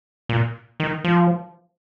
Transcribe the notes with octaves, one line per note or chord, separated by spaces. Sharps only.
A#2
D#3
F3